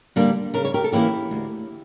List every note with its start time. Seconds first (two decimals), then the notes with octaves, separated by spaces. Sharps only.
0.16 D3 G3 A#3 D4
0.54 C#3 A#4
0.65 C#5
0.74 G4 A#4
0.84 A4
0.92 E3 G3 A#3 C#4 E4 G4
1.31 D2